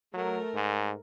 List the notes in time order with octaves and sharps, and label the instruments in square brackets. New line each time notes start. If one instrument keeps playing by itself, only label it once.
[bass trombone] F#3 [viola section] A3 A#4
[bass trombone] G#2